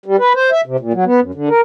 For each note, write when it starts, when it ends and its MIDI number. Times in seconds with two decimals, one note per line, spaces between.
0.06 0.16 55
0.19 0.33 71
0.35 0.50 72
0.52 0.61 76
0.66 0.77 48
0.80 0.93 46
0.94 1.05 54
1.05 1.20 59
1.20 1.31 42
1.34 1.49 50
1.49 1.61 70